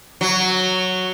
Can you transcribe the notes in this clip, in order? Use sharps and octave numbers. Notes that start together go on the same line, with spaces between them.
F#3